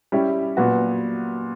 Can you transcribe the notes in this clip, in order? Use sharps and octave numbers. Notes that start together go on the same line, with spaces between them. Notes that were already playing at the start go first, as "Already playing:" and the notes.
G3 C#4 E4 G4
A#2 F#3 B3 F#4 B4